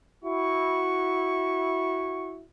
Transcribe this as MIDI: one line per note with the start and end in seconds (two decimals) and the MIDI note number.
0.24 2.45 64
0.24 2.45 66
0.24 2.36 85